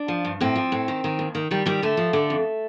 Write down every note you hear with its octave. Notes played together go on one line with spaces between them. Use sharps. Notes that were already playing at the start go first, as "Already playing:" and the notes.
Already playing: D4
F3
G2
A2 C4
F3
A2
D#3
D#3
D#2
D#3
D#3 G3
D#3 G3
D3 A3
F3
D3
F2